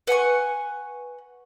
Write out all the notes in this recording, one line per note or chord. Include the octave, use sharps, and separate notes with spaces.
B4 F#5 G#5 C#6